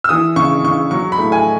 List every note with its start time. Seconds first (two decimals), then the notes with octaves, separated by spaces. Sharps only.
0.04 E6
0.09 E3 D#6
0.36 C#3 C#6
0.63 C#3 C#6
0.91 F#3 C#6
1.12 B5
1.18 A2
1.32 G#5